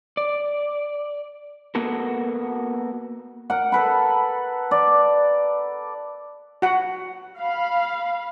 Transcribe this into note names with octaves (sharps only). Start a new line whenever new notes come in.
D5
A#3 B3 F#4 A4 A#4
A#4 F#5
A4 B4 B5
D5
F#4 F#5
F5 B5